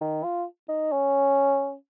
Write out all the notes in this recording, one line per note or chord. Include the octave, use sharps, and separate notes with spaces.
D#3
F4
D#4
C#4